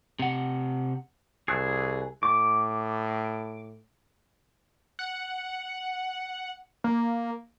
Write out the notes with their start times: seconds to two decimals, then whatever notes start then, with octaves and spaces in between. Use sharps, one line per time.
0.19 C3 F#5
1.48 C2 G#4 E6 F#6
2.23 A2 D6
4.99 F#5
6.84 A#3